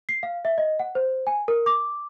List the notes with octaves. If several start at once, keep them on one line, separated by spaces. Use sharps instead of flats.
C7
F5
E5
D#5
F#5
C5
G#5
A#4
D6